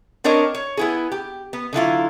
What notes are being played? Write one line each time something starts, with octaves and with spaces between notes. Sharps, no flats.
C4 D4 A#4 C#5 D#5
C#5
B3 E4 G#4
G4
B3
D3 F#3 E4 F4